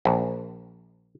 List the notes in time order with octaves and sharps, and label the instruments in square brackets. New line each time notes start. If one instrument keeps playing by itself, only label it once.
[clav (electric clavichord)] A#1